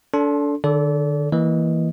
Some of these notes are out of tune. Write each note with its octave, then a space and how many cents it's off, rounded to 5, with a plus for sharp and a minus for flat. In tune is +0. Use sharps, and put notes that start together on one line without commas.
D4 -30 A4 +0 C6 +20
D3 +40 A4 -20 D5 -30
E3 +0 A#3 +0 D#5 +0